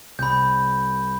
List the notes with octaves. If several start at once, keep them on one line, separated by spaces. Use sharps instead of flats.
C2 B5 G6